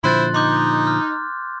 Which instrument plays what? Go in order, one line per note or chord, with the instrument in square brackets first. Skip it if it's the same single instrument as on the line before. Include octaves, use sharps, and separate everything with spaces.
[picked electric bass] A#2 D3 F3 [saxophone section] E4 C5 [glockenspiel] C6 F#6 A6
[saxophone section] D#4 [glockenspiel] C6 D6 G6
[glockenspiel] F6